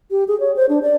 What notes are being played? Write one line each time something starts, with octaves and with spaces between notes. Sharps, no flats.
G4
G#4
C#5
C5
D4
D5